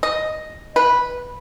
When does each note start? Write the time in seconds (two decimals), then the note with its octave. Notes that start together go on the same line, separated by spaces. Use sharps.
0.03 D#5
0.76 B4